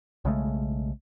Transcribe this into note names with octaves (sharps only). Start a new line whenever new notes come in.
B1 C#3 G#3 A3